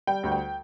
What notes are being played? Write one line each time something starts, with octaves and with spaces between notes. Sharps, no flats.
G3 G5
D2
G5